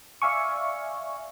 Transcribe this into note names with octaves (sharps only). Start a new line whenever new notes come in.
D5 E5 F5 G#5 C#6